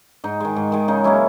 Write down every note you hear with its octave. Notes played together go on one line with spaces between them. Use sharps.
G#2 D#4
D#3 G#3
G#2
D#3 G#3
C#3 D#4
F#3 A#3 C#4 E4